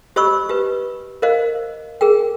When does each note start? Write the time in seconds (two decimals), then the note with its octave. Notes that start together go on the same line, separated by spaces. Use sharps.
0.16 G4 C5 D#5 B5 C#6 E6
0.49 G4 B4
1.22 A#4 C5 D#5 F5
2.01 G#4 A#4 G5